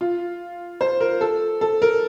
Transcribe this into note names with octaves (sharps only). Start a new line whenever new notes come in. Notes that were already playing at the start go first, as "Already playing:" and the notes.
F4
C5
A#4
A4
A4
A#4